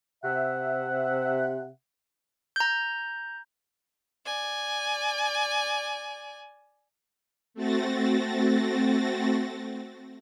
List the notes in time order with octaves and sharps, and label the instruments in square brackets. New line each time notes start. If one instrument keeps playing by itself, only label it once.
[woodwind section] C3 E5 F#5
[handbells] A#5 G6
[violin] D5 G#5
[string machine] A3 C4 F#4 A6 A#6